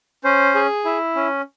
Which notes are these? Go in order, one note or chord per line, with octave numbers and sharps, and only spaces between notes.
C#4 C5
G#4
E4
C#4